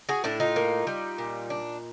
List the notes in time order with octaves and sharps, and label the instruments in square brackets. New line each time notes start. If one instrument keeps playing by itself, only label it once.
[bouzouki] F#4 G#4
A2 D4 E4
D#4 F4
A#3
G3
A#2
D4